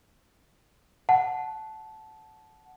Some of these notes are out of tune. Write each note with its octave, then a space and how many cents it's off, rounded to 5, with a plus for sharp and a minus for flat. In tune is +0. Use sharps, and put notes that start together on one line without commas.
F#5 +0 A5 -15